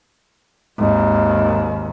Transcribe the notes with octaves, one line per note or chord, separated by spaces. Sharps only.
G#1 D#2